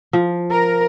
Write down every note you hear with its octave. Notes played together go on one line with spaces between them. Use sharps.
F3
A#4